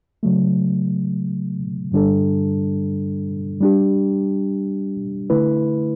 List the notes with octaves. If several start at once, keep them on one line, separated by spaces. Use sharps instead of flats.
C#3 F#3 A3
G2 D3 G3 D4 A4
G3 D4 G4
D3 A3 E4 B4